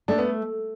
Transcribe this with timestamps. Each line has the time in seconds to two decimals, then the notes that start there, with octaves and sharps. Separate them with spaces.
0.08 A3 D4
0.18 B3